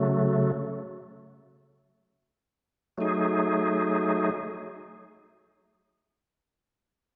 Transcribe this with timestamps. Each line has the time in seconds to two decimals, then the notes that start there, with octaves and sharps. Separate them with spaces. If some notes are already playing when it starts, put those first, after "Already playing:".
Already playing: C#3 F#3 A3
2.98 F#3 A3 D#4 G#4